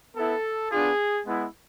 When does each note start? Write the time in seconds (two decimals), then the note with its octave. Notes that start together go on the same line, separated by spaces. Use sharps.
0.16 B3 E4 A4
0.71 B3 D4 F4 G#4
1.27 G#3 B3 E4